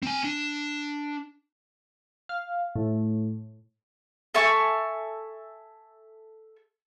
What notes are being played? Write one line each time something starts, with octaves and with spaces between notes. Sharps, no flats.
C4 G#5
D4
F5
A2
A4 E5 G#5 C#6